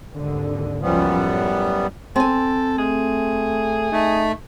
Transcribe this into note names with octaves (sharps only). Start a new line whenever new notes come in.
G#1 D#2 D3
C#2 F#2 F3 G3 B3 C#4
A2
C4 A4 G#5
A3 G#4
A3 D#4